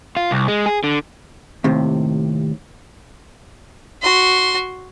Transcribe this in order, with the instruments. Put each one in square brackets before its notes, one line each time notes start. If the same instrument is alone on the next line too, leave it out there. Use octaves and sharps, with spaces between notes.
[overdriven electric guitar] F4
C2
G#3
G#4
D3
[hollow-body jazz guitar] D#2 A2 C3
[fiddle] F#4 C6